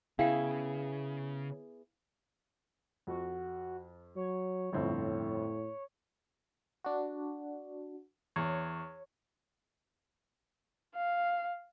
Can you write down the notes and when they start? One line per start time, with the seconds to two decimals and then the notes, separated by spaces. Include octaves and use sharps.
0.19 C#3 B3 E4 G#4 F5 G5
3.07 F2 F#4
4.16 F#3 C#5
4.73 G1 F2 A2 C4
6.85 D4 F#4
8.36 E2 C#5
10.96 F5